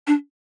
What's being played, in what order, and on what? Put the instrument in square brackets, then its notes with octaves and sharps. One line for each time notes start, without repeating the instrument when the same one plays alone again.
[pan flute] D4